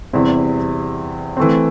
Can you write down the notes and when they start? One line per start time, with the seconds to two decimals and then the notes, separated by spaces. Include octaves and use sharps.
0.13 E2 C3 G3 C4 E4
1.37 E3 A3 C4